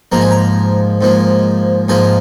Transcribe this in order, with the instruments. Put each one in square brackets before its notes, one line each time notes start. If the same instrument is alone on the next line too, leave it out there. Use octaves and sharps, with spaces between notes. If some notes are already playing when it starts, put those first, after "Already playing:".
[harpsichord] G#2 F3 A#3 A#5
G#5
A#5
G#2 F3 A#3
G#2 F3 A#3 G#5